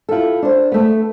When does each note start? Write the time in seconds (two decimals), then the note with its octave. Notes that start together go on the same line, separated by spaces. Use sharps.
0.09 E4 F4 G4 A4
0.42 D4 C5
0.72 A3 B3